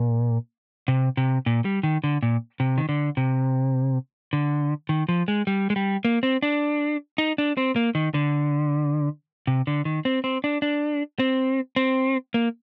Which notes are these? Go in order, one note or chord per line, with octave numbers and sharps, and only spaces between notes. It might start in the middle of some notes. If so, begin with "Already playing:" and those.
Already playing: A#2
C3
C3
A#2
G3
D#3
D3
A#2
C3
D#3
D3
C3
D3
D#3
F3
G#3
G3
G#3
G3
A#3
C4
D4
D#4
D4
C4
A#3
D#3
D3
C3
D3
D#3
C4
C4
D4
D4
C4
C4
A#3